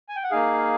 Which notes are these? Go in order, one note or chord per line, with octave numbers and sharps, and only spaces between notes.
G#5
G5
F#5
A#3 D#4 G#4 F5